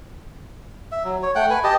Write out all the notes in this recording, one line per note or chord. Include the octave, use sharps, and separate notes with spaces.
E5
F#3
C#5
A3 F#5 G5
B4 G#5
G4 D#5 A5